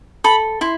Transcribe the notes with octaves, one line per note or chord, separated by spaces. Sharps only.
A4 B5
E4 C6